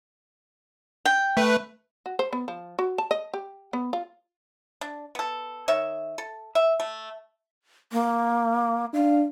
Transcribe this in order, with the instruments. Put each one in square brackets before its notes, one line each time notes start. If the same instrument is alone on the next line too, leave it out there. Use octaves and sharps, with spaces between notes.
[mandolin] G5
[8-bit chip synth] A3 B4
[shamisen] F#4
C5
B3
F3
F#4
A5
D#5
G4
B3
F4
[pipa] D4
B3 A4
D#3 C#5 E5
A4
E5
A3
[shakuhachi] A#3
[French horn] D4 [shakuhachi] F5